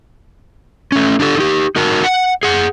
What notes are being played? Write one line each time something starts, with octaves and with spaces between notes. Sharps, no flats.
A3 C#4
D4 G4 A4
D#4 G4
D#4 F#4 A#4 A5
F#5
G#4 F#5